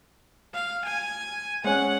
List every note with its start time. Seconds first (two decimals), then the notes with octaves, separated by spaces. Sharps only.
0.54 F5
0.85 G#5
1.64 G#3 C#4 F#5